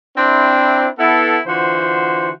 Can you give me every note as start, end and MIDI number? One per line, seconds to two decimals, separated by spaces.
0.17 0.87 60
0.17 0.87 62
0.17 0.87 64
0.99 1.39 59
0.99 1.39 64
0.99 1.39 69
1.47 2.31 50
1.47 2.31 52
1.47 2.31 65
1.47 2.31 66
1.47 2.31 72